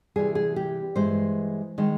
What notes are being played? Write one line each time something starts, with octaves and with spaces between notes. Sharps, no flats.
C3 E3 G3 G#4
G#4
G4
G2 E3 G#3 C5
D#3 G#3